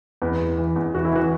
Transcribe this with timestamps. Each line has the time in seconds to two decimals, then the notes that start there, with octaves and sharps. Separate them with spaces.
0.22 E2 B4
0.40 E2
0.58 E3
0.76 E2
0.94 E3 F#4
1.05 E4
1.13 E3 F#4